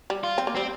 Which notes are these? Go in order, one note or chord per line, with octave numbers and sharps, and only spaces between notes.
G3
F4
C4
A#3
G3 C4